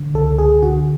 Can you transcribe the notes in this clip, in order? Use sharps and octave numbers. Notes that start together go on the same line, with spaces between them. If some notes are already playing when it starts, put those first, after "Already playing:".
Already playing: D3
C#2 A4
C#2 G#4
D3 F#4